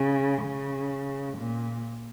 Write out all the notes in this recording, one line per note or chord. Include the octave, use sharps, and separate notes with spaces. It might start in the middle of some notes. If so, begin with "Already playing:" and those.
Already playing: C#3
C#3
A#2